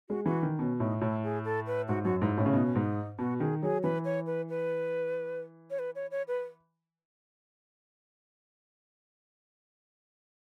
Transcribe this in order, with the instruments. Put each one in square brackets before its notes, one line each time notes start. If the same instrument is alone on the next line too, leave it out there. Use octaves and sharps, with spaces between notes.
[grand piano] G#3 [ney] F#4
[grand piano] E3 [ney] F#4
[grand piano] D#3
[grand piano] B2 [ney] C#4
[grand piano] A2 [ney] D#4
[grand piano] A2 [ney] E4
[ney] G#4
A4
B4
[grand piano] G#2 [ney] F#4
[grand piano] F#2 [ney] F#4
[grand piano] G#2 [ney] E4
[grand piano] A2 [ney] C#4
[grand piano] C#3
[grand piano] B2 [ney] D#4
[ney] C#4
[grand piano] G#2 [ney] D#4
[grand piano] B2 [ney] F#4
[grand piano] D#3 [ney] G#4
[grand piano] F#3 [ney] G#4
[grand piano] E3 [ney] B4
[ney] C#5
B4
B4
C#5
B4
C#5
C#5
B4